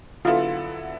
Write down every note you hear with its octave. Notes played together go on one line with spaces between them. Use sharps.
D3 F#3 B3 E4 F4 A4